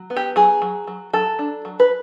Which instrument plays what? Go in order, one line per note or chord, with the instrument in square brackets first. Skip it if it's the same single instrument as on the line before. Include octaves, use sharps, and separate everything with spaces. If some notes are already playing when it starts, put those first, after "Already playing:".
Already playing: [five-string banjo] F#3
B3
G4
F#3 G#4
F#3
F#3
F#3 A4
D4
F#3
B4